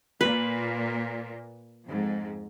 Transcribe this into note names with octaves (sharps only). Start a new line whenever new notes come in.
A#2 B4
F2 G#2